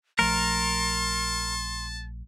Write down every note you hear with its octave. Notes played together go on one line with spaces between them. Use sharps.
A#1 F3 A3 A#4 A5 C6